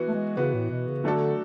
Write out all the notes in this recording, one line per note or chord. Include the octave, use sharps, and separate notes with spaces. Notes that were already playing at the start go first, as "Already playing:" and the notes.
Already playing: E3 B3 F#4
A3
G#3
C#3 E3 B3 F#4
A2
B2
C#3
D3 F#3 A3 D4 F#4 A4